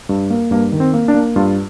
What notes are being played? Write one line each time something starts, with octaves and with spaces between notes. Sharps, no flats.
G2
A#3
G2 A#3
D#3
C4
A#3
D4
A#3
G2 F4